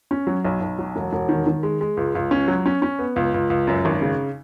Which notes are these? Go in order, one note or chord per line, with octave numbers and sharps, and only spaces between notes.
C#4
F#3
B1
B1
F#3
E1
E1
D#3
D#3
G#3
G#3
C#2
C#2
C#4
F#3
C#4
C#4
B3
C#2
C#2
C#2
F#2
G#1
C#3